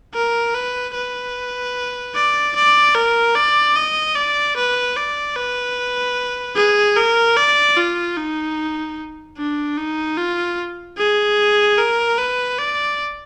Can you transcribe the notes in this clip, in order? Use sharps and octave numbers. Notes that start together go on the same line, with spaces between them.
A#4
B4
B4
D5
D5
A#4
D5
D#5
D5
B4
D5
B4
G#4
A#4
D5
F4
D#4
D4
D#4
F4
G#4
A#4
B4
D5